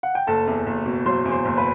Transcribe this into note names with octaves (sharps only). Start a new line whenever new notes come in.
F#5
G5
F#1 A4 A5
E2
F#1
B2
F#3 C5 C6
E2
C5 C6
F#1
B4 B5